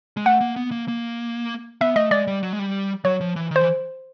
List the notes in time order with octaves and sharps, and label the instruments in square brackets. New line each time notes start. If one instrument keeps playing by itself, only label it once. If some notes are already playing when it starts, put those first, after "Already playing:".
[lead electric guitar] G#3
[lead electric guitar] A3 [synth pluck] F#5
[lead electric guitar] A#3
B3
A#3
A#3
[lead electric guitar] B3 [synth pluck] E5
[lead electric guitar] A3 [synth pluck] D#5
[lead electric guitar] G#3 [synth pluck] D5
[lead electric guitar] G3
F#3
G#3
G3
[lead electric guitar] F#3 [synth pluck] C#5
[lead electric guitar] F3
E3
[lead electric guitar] D#3 [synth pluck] C5
[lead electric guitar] E3